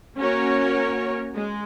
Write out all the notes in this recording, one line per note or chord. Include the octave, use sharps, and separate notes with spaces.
A#3 C#4 F#4 A#4 C#5
G#3